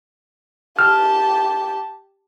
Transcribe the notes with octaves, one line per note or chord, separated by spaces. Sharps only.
G4 A5 F6